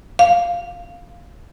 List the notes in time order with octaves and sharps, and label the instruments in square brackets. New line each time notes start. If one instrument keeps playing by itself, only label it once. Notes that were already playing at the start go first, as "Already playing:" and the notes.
[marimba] F5